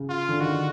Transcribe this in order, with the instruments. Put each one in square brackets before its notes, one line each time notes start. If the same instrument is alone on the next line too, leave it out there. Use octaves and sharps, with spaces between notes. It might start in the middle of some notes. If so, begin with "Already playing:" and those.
Already playing: [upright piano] C#3
[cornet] F4
[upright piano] D3
[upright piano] D#3 [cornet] F#4